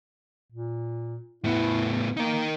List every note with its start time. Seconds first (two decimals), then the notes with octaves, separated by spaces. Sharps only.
0.52 A#2
1.44 A2 B3 E4
2.17 A#3 D#4 A#4